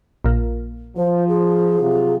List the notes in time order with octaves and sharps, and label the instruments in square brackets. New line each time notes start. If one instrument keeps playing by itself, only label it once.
[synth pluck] A#1 A#2
[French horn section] F3 [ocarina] C5
[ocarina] G#4
[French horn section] C3 F#3 F4